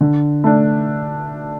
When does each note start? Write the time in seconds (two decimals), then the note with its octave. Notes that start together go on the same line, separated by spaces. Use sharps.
0.01 D3
0.44 A3 D4